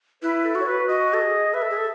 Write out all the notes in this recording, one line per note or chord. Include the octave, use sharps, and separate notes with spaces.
E4 B4
A4
F#4
C#5
B4
F#4 D#5
A4
G#4
B4 E5
A4
G#4
A4